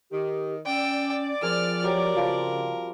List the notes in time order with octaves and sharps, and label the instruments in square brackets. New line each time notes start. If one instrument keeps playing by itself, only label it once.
[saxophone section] D#3 [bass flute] G4
[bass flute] C#4 [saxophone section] D5 [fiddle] G5 E6
[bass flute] F3 [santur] C4 G#4 A#4 [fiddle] F6
[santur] F#3 G4 [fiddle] A#4
[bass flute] C#3 [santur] F3 G3 C6